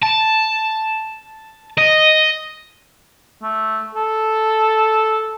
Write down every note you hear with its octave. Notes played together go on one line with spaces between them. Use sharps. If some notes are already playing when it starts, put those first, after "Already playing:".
A5
D#5
A3
A4